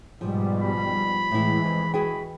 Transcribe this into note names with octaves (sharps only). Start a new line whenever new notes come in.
G#2 B2 F3 G3
B5
A2 E3 G#3 E4
F2
F#4 G#4 G5 B5